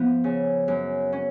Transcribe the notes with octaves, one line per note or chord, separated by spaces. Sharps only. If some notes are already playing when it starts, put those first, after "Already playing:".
Already playing: F3 B3 F4
C#3
F#2
C#4